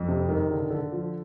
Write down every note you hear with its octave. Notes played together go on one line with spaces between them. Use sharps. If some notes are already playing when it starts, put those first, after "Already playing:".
Already playing: F2
C3
D#3
D3
D3
F3